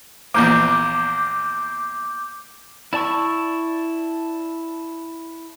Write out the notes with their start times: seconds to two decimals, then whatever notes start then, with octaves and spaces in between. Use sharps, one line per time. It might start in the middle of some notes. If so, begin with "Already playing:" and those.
0.34 A#1 E2 A#3 D6 G6
2.93 E4 D5 A5 C#6 E6